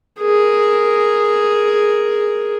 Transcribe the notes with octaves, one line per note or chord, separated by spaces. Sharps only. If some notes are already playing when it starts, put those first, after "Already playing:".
G#4 A#4